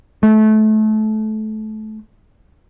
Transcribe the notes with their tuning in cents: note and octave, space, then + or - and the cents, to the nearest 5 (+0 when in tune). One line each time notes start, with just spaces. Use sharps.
A3 -25